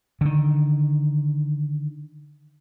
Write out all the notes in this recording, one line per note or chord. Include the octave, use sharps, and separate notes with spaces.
D3 D#3